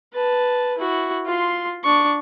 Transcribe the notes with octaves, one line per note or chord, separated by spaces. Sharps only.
B4 A5
E4 F#4
F4 C6
D4 C#6